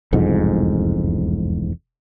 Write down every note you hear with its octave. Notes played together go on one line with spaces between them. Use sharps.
E1 C2 F2 G#2